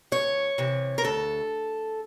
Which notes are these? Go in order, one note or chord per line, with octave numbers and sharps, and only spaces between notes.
D2 C#5
C3 E3
A#4
D2 A4